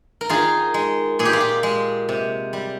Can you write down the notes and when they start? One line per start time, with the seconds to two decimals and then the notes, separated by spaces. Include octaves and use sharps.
0.21 A#4
0.29 D#3 F4 G#4
0.74 G#3
1.19 A#2 G#4
1.25 G4
1.33 F4
1.40 G4
1.63 G#3
2.09 C3
2.53 G3